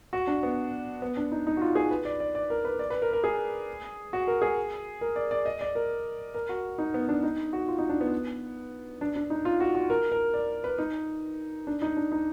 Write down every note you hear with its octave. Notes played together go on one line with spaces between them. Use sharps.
F#4
D4
B3
B3
D4
D#4
D#4
F#4
F4
G#4
B4
D5
D5
D5
A#4
B4
D5
B4
A#4
A#4
G#4
F#4
A#4
G#4
A#4
D5
D5
D#5
D5
A#4
A#4
F#4
D#4
B3
D4
D#4
F#4
F4
D#4
D4
B3
D4
D4
D#4
F4
F#4
F#4
A#4
A#4
D5
B4
D#4
D4
D#4
D4
D#4